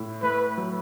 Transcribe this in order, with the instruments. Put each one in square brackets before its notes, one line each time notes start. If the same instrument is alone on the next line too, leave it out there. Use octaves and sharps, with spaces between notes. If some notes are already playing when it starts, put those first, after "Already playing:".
Already playing: [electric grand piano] A2 E4
[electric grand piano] A3 [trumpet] B4
[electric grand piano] F#3